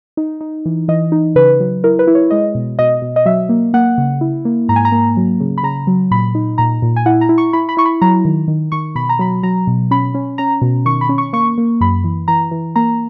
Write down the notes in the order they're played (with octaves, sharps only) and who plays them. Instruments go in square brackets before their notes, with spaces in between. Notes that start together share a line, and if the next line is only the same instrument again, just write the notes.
[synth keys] D#4
D#4
E3
E3 D#5
D#4
C#3 B4
F#3
E4 A#4
B4
E4
C#5
G#3 D#5
B2
B2 D#5
B2
D#5
F#3 E5
A#3
A#3 F#5
C#3
E4
A#3
G#2 A#5
G#5
A#5
A#3
F#3
C#3
B5
C#3 A#5
F#3
A#2 B5
D#4
A#2 A#5
A#2
G#5
E4 F#5
A#5
E4
C#6
E4 B5
B5
E4 C#6
B5
F#3 A#5
D#3
D#3
D#3 C#6
B2 B5
A#5
F#3 B5
F#3 A#5
B2
C#4 B5
C#4
C#4 A#5
B2
D#3 C#6
B5
C#4
C#6
A#3 C#6
A#3
F#2 B5
E3
E3 A#5
E3
A#3 A#5